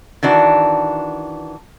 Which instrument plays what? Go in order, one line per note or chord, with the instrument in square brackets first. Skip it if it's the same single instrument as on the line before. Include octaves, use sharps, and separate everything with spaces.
[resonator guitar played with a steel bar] D#3 E3 D4 F#4